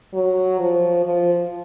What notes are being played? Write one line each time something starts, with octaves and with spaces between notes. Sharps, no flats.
F#3
F3
F3